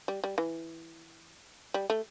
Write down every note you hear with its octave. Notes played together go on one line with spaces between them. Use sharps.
G3
G3
E3
G3
A3